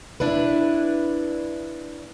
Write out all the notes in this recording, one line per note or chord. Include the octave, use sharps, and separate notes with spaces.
D4 E4 B4